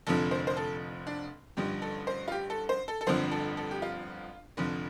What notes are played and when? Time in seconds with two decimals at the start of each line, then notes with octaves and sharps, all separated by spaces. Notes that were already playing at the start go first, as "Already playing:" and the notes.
0.07 F1 F2 D3 F3 A4
0.31 C5
0.47 C5
0.57 A4
1.07 D4
1.57 A1 G2 D3 F3 G4
1.82 A4
2.07 C5
2.28 F4
2.32 G4
2.50 A4
2.69 C5
2.88 A4
3.01 A4
3.07 G1 F2 D3 F3 C5
3.31 A4
3.57 A4
3.71 G4
3.82 F4
4.57 F1 F2 D3 F3